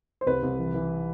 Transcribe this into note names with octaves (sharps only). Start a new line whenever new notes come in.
C5
C2 B4
C2
E3
E3